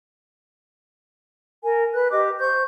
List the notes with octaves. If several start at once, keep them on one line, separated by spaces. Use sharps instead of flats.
A#4 G#5
B4 F#6
G4 D#5 D6
C5 C#6 G6